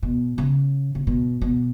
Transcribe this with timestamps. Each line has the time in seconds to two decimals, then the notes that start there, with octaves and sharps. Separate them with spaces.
0.03 B2
0.38 C#3
0.95 C#3
1.07 B2
1.41 B2